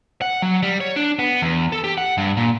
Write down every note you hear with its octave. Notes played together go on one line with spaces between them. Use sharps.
F#5
F#3
G3
C#5
D4
B3
E2
A4
G4
F#5
G2
A#2